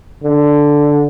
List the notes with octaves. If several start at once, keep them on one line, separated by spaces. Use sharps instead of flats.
D3